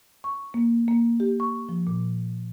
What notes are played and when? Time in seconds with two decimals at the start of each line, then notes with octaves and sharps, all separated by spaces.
0.24 C#6
0.54 A#3
0.88 A#3
1.20 G4
1.40 C#6
1.69 F3
1.87 A#2